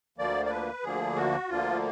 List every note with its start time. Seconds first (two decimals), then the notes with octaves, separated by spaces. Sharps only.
0.18 D2 D3 F3 A#3 D5
0.45 D5
0.50 B4
0.83 D2 D3 F3 A#3 G#4
1.16 F#4
1.49 D2 D3 F3 A#3 F4